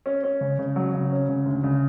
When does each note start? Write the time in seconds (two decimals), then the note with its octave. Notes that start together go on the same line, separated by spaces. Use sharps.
0.06 C#4
0.24 C#4
0.41 C#3
0.59 C#3
0.76 F#3
0.94 C#3
1.11 C#4
1.29 C#3
1.46 D2
1.64 C#3